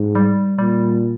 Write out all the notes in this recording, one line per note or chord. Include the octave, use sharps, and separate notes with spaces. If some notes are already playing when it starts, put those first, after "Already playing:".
Already playing: G#2
G3
A#2 G3